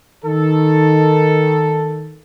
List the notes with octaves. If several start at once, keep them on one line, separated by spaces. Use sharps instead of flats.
D#3 A4